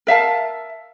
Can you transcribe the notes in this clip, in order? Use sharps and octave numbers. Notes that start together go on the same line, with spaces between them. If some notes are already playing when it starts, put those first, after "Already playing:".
A#4 E5 F5 A5